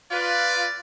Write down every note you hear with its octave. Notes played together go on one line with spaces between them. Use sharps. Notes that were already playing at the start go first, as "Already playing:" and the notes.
F4 B4 D5